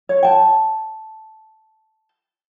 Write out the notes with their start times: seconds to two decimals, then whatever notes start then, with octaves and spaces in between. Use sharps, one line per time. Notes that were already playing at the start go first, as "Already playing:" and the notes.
0.09 C#5
0.23 G5 A5